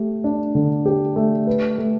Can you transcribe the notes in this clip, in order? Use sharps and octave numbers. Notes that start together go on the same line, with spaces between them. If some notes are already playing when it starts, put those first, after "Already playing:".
Already playing: A3 G4
D4
D3
G4
A3
B4
A3